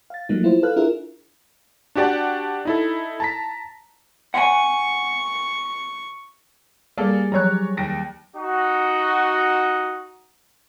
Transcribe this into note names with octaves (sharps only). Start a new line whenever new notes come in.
F5 A6
F3 F#3 A3 A#3 D#4
E4 F4 C5
A4 B4 F5 F6 F#6
D4 E4 F4 G#4 A#4 E5
D4 F#4 G4 D5 F#5 A5
D#4 E4 A4
A5 A#5 B6
F#5 G#5 C#6
G3 A#3 G#4 A4 D5
F3 F#3 G4 C#5 A#5 F#6
D#2 A#6 D7
D#4 F#4